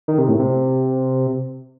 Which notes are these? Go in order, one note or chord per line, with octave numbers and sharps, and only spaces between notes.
D#3
C3
A2
C3